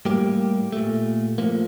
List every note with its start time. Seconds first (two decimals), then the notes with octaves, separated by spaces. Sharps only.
0.05 A2 G3 A#3 G4
0.72 A#2 A3
1.38 A2 F3 A#3